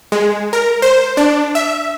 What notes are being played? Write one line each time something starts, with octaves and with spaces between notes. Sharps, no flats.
G#3
A#4
C5
D4
E5